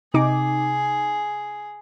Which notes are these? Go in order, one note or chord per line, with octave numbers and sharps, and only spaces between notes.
C3 D#4 G#4 D6